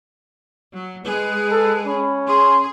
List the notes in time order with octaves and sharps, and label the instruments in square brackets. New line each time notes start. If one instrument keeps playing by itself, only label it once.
[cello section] F#3
[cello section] G#3 G#4 [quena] B4
[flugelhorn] A4
[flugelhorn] C#4 [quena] B5
[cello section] G#4 [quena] C6